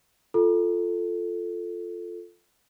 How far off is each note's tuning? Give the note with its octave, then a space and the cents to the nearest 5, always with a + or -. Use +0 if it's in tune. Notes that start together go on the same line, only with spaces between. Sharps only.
F4 +0 A4 +0